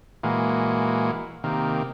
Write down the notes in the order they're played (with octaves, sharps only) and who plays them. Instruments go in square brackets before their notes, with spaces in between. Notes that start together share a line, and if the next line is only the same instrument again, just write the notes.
[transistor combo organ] A#2 E3 G#3 A#3 F#4
C3 D#3 A#3